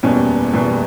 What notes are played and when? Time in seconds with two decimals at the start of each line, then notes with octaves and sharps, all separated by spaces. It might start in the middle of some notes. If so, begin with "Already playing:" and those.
0.03 F#1 E2 B2 G3 C#4
0.53 F#1 E2 B2 G3